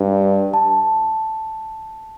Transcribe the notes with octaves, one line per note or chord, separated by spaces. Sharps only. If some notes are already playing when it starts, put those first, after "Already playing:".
Already playing: G2
A5